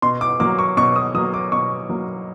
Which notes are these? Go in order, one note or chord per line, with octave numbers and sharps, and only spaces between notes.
B2 C6
D6
F#3 A#3 D6
C#6
B2 C#6
D#6
F#3 A#3 D#6
D6
B2 C#6
F#3 A#3